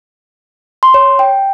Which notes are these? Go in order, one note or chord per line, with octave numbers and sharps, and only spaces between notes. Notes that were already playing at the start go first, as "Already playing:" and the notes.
C6
C#5
G5